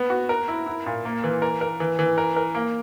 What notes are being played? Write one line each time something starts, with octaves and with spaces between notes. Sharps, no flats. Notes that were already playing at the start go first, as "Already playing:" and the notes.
Already playing: B3
F#4
A#4
E4
E4
A#2
A#3
E3
A#4
A#4
E3
E3
A#4
A#4
A#3